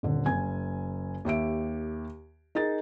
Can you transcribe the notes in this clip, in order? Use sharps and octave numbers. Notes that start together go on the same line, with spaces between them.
D#1 D3
F#1 G#5 G#6
D#2 G4 E5 D7
D#4 G#4 A#4 A6